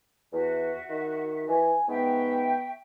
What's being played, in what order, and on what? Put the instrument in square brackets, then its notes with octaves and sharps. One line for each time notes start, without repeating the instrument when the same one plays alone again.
[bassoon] E2 [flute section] F#4 E5
[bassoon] D#3
[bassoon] E3 [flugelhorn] G#5
[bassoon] G#2 [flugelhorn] B3 [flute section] E5 G5 C#6